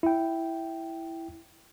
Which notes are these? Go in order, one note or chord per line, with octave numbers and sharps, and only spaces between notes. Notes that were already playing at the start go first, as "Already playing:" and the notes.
E4 G5